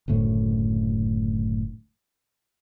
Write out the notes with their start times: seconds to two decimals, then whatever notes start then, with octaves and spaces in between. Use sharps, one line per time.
0.08 F#1 D2 A2 A3